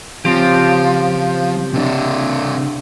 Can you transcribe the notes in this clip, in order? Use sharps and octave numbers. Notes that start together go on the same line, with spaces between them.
C#3 F3 C4 G4
C3 D4